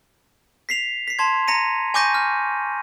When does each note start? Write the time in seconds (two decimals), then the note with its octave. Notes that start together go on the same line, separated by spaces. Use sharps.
0.69 B6 C7 F7
1.08 B6 C7
1.19 A5 C6 G#6
1.48 A#5 A#6 C#7 D#7
1.94 G#5 C#6 D6 G6 A#6 D#7
2.14 F6